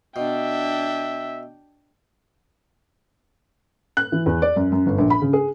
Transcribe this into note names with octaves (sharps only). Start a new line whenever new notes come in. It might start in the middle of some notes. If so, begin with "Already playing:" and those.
B2 D4 E5 G5
F#6
E3
E2
D5
F#2
F#2
G1
A#1
B5
C#3
G#4